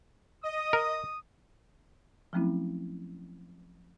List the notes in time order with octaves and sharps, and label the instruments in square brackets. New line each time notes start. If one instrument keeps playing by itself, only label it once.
[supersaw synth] D#5 [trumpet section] D#6
[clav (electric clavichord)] A#4
[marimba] F3 F#3 A3 C4 C#4 E4